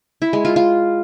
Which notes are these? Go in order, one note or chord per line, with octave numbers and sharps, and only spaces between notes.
E4
G#3
F4
F4